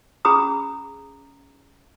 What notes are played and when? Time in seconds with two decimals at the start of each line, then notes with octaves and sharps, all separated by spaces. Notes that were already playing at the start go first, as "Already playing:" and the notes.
0.25 C#4 G#4 A#5 B5 D#6